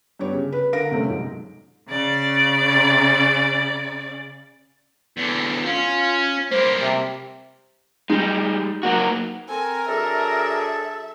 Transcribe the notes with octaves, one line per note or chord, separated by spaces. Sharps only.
G2 B3 G4 C#5
C#3
B4
D3 A#4 F5 A#6 D7
C3 G3 A3 C#4
B1 G#2
C#3 D5
E2 D3
C#4 F4
G3 A#3 C5
C3
G3 G#3 D#4
F#3 A#3 F#4
C4 A4 A#4 G#5
F#3 D4 G#4 A4 E5